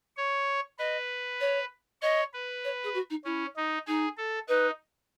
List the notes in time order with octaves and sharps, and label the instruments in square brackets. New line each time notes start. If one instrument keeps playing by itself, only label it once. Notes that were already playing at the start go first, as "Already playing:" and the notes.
[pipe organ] C#5
[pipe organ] B4 [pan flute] D#5
[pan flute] C#5
[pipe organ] C#5 [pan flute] D#5
[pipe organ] B4
[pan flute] C#5
G#4
F#4
D#4
[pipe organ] C#4 [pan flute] E4
[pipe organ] D#4
[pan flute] D#4 [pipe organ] G#4
[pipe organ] A4
[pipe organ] D#4 [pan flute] B4